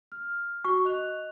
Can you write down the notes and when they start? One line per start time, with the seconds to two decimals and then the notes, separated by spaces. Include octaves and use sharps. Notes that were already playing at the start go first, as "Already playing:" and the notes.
0.12 F6
0.64 F#4 C#6
0.85 D#5 F#6 F7